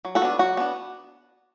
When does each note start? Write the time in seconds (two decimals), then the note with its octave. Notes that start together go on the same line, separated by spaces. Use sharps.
0.05 F#3
0.15 F#4 A4
0.22 B3 D4
0.39 F#3 F#4
0.57 B3 D4